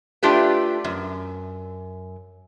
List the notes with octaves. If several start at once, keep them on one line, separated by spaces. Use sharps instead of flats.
A3 D4 F4 G4 B4
F#2